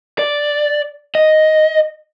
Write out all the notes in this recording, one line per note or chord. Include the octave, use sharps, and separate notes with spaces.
D5
D#5